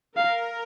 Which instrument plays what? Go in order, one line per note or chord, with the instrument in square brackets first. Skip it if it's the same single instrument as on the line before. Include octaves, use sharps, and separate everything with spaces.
[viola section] A#4 [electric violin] F5